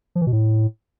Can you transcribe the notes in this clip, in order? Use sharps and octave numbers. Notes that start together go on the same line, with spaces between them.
F3
E3
B2
A2